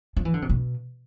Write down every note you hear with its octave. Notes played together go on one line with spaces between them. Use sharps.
F3
E3
D3
C3
B2